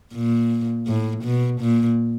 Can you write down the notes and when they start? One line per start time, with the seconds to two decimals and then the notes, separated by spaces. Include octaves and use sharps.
0.14 A#2
0.87 A2
1.24 B2
1.61 A#2